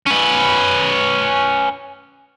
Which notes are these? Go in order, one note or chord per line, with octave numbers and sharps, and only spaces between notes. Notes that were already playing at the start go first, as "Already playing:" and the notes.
C#4 B4